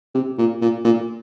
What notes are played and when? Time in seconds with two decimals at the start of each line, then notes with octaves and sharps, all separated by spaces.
0.15 C3
0.38 A#2
0.62 A#2
0.84 A#2